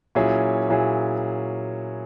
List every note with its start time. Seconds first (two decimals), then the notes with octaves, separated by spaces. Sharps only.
0.15 A#2 F#3 C#4 E4 G#4
0.69 A#2 F#3 C#4 E4 G#4